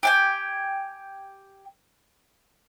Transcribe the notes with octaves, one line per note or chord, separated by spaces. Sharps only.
G4 G5 G#5